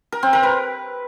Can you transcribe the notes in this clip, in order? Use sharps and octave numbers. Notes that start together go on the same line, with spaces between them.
A#4
C4
A#4
B4